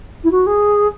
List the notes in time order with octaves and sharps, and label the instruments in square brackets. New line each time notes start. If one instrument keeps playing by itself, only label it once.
[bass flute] E4
F#4
G#4